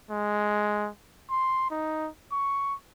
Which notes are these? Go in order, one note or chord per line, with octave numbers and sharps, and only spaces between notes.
G#3
C6
D#4
C#6